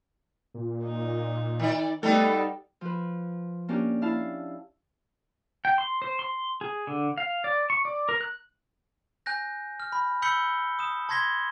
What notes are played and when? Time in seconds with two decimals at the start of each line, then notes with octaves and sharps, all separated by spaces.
0.54 A#2
0.84 D#4
1.60 D#3 D5
2.03 G3 A3 B3 D#4 A4
2.81 F3 B4
3.68 A#3 C#4 D4 G4
4.02 E4 F5 A5
5.65 G5
5.78 C6
6.02 C5
6.19 C6
6.61 G#4
6.87 D3
7.18 F5
7.44 D5
7.70 C#6
7.85 D5
8.09 A#4
8.21 F#6
9.26 G#5 F#6 G6 A#6
9.80 F6
9.92 B5
10.22 B5 E6 G6 B6 C#7 G7
10.79 D#6 E7
11.09 A5 C6 G#6 A#6 B6 G7